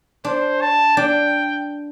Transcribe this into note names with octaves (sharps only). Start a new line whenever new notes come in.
D4 C5
A5
D4 G5